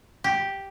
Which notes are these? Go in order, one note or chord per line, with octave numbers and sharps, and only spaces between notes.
G4